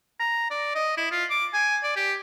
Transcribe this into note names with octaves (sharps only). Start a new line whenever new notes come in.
A#5
D5
D#5
E4
F4
D6
G#5
D5
G4